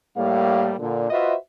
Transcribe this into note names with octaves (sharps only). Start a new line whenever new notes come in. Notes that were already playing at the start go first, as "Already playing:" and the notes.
A2 G3 A#3 F5
A#2 D3
F4 F#4 B4 C5 D#5 E5